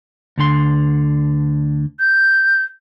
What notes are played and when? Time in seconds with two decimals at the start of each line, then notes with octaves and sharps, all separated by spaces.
0.38 D2 D3 C6
2.00 G6